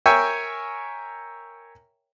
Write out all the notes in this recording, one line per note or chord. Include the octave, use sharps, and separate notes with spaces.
A#4 C#5 E5 G5 G#5